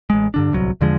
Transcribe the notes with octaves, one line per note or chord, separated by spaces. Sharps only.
A1 G#3
G2 D3 D4
D1 C2 F#3
E2 D3 F3 G#3